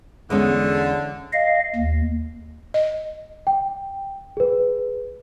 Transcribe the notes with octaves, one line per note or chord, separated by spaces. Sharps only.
E2 D3 G#3 C#4
D#5 F5
D#2
D#5
G5
G#4 B4